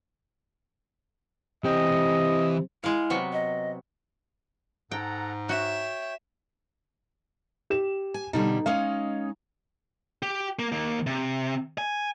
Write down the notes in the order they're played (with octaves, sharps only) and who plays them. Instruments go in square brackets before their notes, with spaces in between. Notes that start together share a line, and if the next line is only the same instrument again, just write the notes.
[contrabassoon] C3 [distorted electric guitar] E3 G5 [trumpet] D#5
[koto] G#3 F5 [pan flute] E4
[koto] C3 F#3 B3
[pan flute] D#5
[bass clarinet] G#2 [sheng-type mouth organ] A4 F#5 A#5 [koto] G5
[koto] F#4 [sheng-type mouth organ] C#5 G5 [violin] E5
[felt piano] G4 E7
[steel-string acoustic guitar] G#5
[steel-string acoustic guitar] B2 D3 G3 [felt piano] D#4
[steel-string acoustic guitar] G#3 C#4 D#4 [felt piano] F5
[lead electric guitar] G4
A#3
D#2 A#3
C3
G#5